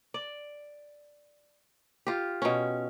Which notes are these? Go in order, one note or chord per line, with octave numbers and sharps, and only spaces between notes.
D5
F4 G4
B2 C#4